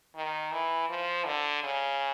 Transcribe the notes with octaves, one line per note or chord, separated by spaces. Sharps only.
D#3
E3
F3
D3
C#3